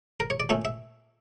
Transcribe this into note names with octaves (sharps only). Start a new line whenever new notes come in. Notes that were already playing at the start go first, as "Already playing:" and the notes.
A#4
C#5
D5
A#2 A3 C#4 E5
E5